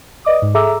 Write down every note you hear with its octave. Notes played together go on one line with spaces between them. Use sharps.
B4 D5 D#5 D6 D#6
G#2
G#4 A4 E5 A#5 D6 E6